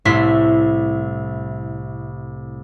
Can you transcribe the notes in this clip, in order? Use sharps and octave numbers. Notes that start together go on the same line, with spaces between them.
C2 A2 A3 E4 C6 B6